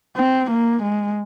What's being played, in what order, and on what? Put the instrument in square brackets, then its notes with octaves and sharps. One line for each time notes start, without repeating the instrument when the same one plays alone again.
[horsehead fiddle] C4
A#3
G#3